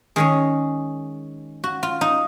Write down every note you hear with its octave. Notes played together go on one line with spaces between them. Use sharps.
D#3 G#3 C#4 G#4
F#4
F4
D#4